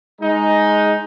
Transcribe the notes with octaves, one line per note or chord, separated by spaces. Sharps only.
G#3 D#4